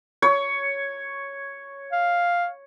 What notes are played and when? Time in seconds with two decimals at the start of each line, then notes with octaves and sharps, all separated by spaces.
0.22 C#5
1.93 F5